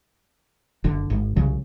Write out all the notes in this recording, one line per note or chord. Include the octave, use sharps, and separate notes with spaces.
F#1 D3
G#1
C2 C#3 F#3